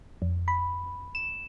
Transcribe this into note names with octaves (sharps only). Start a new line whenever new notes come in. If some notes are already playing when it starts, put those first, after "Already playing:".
F2
B5
E7